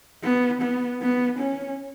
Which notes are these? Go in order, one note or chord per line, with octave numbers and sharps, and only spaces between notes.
B3
B3
B3
C#4